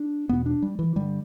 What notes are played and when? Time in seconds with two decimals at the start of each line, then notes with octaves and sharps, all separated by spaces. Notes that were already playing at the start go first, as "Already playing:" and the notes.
Already playing: D4
0.29 E2 B2 B3
0.46 D4
0.62 G3
0.79 E3
0.96 G2 D3 G3